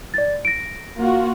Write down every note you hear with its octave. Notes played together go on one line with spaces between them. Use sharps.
D5 A6
A#6 D7
A#3 F4 F#4